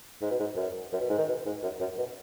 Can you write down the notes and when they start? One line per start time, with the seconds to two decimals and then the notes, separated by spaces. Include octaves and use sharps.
0.21 G#2
0.31 B2
0.40 G#2
0.56 F#2
0.93 F#2
1.00 B2
1.10 G#2
1.18 D#3
1.28 B2
1.46 G#2
1.63 F#2
1.80 F#2
1.98 B2